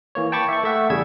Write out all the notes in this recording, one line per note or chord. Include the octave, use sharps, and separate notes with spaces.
E3 A#3 C#5
G5 A5 B5 C#6 D6 A6
E5 C#6
A3 E5 F#5
E2 C#3 G3 G#4 E6 G#6